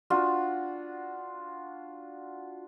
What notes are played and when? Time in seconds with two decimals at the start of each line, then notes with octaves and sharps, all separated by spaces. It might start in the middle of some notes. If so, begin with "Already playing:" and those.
0.10 D4 F4 F#4